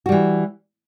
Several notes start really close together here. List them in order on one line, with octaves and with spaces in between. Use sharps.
F#4 G3 E3